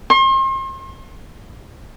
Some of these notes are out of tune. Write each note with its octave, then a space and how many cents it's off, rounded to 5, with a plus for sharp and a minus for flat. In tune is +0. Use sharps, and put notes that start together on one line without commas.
C6 +40